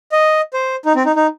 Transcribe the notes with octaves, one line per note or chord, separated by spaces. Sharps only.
D#5
C5
D#4
C4
D#4
D#4